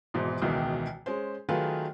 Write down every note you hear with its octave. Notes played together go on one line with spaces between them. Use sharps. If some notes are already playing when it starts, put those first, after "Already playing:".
G#1 G#2 B2 E3
E1 C#2 B2 D#3 E3
G#3 C#4 C5
D#3 F#3 A3 F4 G#4 B4